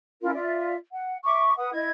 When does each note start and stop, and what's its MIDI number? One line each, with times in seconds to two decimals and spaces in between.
0.21 0.33 61
0.21 0.33 64
0.21 0.33 65
0.21 0.33 70
0.34 0.74 65
0.34 0.74 74
0.34 0.74 76
0.92 1.17 78
1.24 1.52 76
1.24 1.52 85
1.24 1.52 86
1.57 1.73 71
1.57 1.73 78
1.57 1.73 87
1.73 1.91 64
1.73 1.91 75
1.73 1.91 92